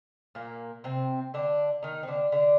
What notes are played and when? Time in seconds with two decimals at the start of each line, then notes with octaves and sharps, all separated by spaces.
0.35 A#2 A#3
0.84 C3 C4
1.34 D3 D4
1.83 D#3 D#4
2.03 C4
2.08 D3 D4
2.32 D3 D4